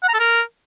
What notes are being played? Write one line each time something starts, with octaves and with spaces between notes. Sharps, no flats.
F#5
A#5
A4
A#4